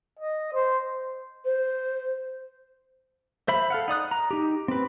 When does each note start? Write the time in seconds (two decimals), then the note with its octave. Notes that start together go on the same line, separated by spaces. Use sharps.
0.19 D#5
0.53 C5
1.45 C5
3.48 C5 E5 B5
3.70 A4 F5 F#5
3.88 D#4 D5 D#6 F#6
4.11 A#5
4.31 D#4 G4
4.68 C4 B4